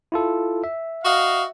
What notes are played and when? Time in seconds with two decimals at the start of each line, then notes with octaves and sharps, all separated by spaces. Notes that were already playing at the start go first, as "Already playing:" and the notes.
0.12 E4 F4 A4
0.64 E5
1.04 F#4 D#5 F5